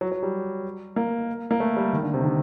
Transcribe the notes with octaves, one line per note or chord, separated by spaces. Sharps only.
F#3
F#3
G3
A#3
A#3
A3
G3
D#3
D3
C3
D#3
D3